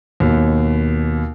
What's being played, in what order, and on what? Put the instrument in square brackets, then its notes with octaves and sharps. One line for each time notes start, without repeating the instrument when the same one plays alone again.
[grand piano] D#2 B2